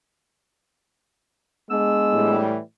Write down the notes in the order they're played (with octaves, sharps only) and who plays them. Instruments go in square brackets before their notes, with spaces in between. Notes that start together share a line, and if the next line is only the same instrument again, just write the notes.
[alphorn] G#3 [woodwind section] B3 D4 E6
[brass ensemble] A2 E3 G3